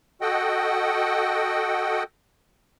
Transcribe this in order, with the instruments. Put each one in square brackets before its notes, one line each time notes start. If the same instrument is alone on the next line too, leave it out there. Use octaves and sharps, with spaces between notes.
[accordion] F#4 A4 D#5 F#5 G5